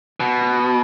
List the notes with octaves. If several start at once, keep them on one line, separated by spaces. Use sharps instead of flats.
B2